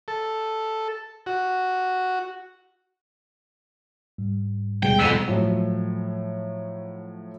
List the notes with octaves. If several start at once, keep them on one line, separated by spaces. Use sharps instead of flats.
A4
F#4
G#2 G3
D#2 B2 G3 G#3 G#4 G5
F2 G#2 B3 E6 B6
A2 F3 F#3